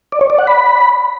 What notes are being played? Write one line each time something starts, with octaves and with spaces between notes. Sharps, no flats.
D5
C#5
D5
F#5
B5